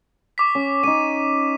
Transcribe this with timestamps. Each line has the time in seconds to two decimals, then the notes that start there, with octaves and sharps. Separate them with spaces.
0.38 C#6 D6 B6
0.55 C#4
0.84 C#4 D#4 D#7